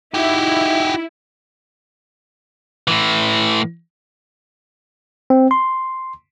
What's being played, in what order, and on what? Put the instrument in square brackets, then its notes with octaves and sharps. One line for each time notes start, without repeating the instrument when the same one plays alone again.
[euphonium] D#4 [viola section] E4 [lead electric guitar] F#4 G4
[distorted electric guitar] A2 E3
[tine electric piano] C4
C6